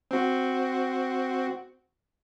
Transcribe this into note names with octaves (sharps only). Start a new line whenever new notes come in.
C4 F#4